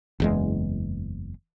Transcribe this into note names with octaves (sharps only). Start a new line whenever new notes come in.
F#1 E2 G#3